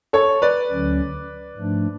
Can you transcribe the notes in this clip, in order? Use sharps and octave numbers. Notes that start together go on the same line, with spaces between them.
A4 C#5
B4 D5
D2 D3 F#3 C#4
G#2 F3 A3 D4